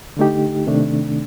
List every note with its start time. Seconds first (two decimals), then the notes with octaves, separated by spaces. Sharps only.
0.17 D3 A3 D#4 G4
0.67 C3 D#3 A3 D4